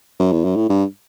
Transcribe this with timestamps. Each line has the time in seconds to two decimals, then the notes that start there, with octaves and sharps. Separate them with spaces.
0.20 F#2
0.32 E2
0.45 F#2
0.56 A2
0.69 G2